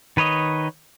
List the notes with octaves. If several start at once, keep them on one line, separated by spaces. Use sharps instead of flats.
D#3 B4 C#5 D#5